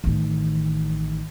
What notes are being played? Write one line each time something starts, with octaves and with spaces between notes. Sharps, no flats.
A1 D#3